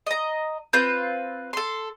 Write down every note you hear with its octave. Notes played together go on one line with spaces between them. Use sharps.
D#5 A#5
C4 F4 B4 G6
A4 C6